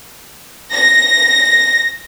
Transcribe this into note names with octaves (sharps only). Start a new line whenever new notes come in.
A#6